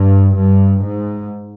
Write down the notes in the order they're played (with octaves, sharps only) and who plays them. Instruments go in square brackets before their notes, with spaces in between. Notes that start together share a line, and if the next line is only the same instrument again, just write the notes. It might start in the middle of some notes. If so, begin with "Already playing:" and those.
Already playing: [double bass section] G2
G2
G#2